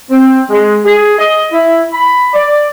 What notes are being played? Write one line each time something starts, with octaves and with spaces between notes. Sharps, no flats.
C4
G#3
G#4
D#5
E4
B5
D5